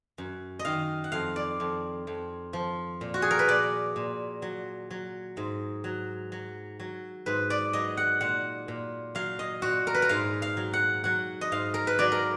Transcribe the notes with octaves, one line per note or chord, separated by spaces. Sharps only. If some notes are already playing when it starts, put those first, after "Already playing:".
F#2
D#5
D#3 F5
F#5
F2 F5
D5
F2
F2
F3
A#2
F#4
G#4
A#4
B4
A#2 D5
A#2
F#3
F#3
G#2
F#3
F#3
F#3
G#2 B4
D5
F#3 D#5
F#5
A#2 F#5
A#2
F#3 F5
D#5
A#2 F#4
A#4
B4
A#4
G#2 F5
F5
F#3
F#5
F#3 F#5
D#5
G#2 F5
A#4
B4
F#3 D5
A#4